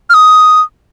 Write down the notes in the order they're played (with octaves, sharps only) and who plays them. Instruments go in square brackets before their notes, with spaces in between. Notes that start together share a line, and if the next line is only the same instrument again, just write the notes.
[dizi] F6
D#6